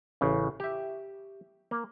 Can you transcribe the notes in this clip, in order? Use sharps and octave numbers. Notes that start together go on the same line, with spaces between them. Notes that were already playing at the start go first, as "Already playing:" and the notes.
A1 C#3
G4 E5
A#3